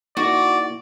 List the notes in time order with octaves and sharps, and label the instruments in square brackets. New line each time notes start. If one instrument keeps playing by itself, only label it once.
[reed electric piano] A#3 D#4 E4 [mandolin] F#4 [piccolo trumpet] D5